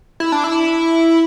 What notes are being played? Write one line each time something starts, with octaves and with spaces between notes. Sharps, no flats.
E4
D4
E4